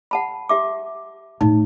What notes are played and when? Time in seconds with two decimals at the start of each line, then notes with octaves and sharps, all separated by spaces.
0.11 F#5 A5 B5
0.49 G4 E5 D6
1.41 A2 D#4